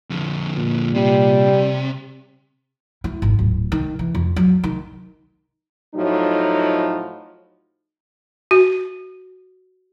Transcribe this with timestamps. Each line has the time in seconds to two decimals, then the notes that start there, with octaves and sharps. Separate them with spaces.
0.10 F2 D3
0.57 A#2
0.95 C3 G3
3.04 E4
3.22 G#1
3.39 D1
3.72 D#3
3.99 E3
4.15 F2
4.36 F#3
4.63 D#3
5.95 A2 F3 F#3 D#4
8.51 F#4